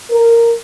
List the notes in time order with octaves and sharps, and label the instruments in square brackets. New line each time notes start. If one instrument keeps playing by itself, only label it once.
[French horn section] A#4